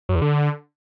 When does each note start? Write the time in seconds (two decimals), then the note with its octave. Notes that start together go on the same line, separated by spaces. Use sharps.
0.09 F#2
0.15 E2
0.22 D3